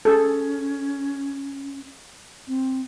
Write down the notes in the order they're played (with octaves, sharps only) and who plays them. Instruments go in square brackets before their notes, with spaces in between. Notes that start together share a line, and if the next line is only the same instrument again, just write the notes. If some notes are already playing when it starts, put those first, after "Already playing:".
[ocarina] C#4 [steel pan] G#4 A4
[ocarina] C4